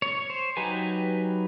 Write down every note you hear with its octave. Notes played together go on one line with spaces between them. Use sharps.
C#5
C5
F#3 D#4 G4 B4 G#5